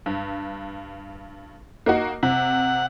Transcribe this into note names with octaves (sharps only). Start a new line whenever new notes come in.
G2
A#3 D#4 F#4
C3 F#5